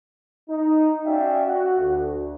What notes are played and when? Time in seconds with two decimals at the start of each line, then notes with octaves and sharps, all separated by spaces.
0.49 D#4
1.05 C#4 F#4 D5 E5 F5 G5
1.46 F#4
1.78 D2